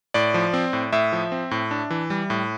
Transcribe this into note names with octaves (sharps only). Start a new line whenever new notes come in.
A2 D5
F3
C4
A2
A2 E5
F3
C4
A2
D4
E3
G3
A2